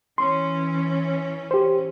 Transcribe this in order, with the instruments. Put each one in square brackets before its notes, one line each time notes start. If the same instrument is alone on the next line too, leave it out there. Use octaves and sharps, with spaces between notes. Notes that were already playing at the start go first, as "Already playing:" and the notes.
[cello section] E3 C#4 [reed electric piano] C6
[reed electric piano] G4 C5